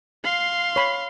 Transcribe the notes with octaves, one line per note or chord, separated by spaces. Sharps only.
F5 C6
C#5 B5